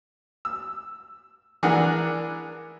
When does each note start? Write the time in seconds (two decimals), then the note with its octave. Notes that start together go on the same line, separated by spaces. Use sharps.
0.45 E6
1.63 E3 D4 G#4 A#4 F#5